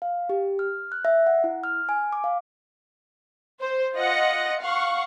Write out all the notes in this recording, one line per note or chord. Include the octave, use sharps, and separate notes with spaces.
F5
G4
F6
F#6
E5
F#5
E4
F6
G#5
D6
F5
C5
F4 D#5 F#5 A#6 C#7
F5 F#5 C#6